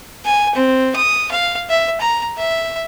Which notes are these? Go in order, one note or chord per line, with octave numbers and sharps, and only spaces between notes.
G#5
C4
D#6
F5
E5
A#5
E5